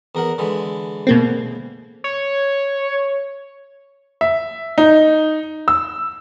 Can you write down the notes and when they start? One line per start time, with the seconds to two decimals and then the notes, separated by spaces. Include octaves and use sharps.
0.15 E2 A#4 F#5
0.38 D3 E3 G#3
1.07 B2 A#3 C4
2.04 C#5
4.21 E5
4.78 D#4
5.68 E6